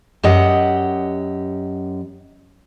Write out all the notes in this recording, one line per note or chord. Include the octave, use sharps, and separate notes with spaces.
F#2 G4 D#5 F#5